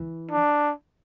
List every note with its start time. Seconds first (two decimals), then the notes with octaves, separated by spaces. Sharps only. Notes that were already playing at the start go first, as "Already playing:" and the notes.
Already playing: E3
0.31 D4